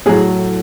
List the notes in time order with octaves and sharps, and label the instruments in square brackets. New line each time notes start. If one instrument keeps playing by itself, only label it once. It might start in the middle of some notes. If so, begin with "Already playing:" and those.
[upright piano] A2 F#3 G#4